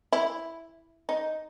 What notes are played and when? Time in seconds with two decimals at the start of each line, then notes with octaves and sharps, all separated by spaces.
0.12 E4
1.09 D#4